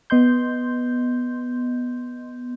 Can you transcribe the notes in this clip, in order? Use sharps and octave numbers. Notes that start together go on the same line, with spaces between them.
B3 D#5 C6 G6